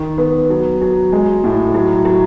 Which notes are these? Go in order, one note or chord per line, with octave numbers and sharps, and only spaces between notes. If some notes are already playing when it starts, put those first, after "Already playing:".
Already playing: D#3
B3
F#3
F#3
G#3
A2
F#3
F#3